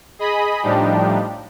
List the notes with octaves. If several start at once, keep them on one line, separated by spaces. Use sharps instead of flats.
G#4 D#5 B5 D#6
A2 F3 G3 D4 D#4 G4